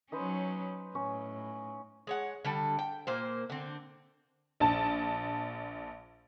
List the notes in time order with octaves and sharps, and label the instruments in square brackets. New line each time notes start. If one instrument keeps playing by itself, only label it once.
[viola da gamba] F#3 C#4 [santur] D#4 B4 C5
[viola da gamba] A2 [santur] C#4
[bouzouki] G#3 C#5 F#5
D3 G3 A4
G5
A#2 A#3 C5
D3 C4
[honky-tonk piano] A#1 A5